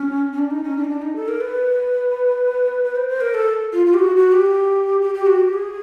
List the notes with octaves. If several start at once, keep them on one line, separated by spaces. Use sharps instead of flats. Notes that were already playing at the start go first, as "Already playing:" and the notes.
Already playing: C#4
C#4
D4
D#4
C#4
D4
D#4
D4
D#4
A4
A#4
B4
B4
C5
C5
A#4
A4
F4
F4
G4
F#4
F#4
G4
G4
G4
F#4
G4
G#4